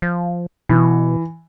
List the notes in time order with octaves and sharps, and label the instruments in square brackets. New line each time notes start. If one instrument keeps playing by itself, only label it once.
[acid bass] F3
[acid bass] B2 [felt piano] E3